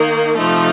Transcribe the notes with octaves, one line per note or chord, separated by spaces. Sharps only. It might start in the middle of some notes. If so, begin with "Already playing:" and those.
Already playing: D#3 A#3 D#4
C3 F3 A3 D#4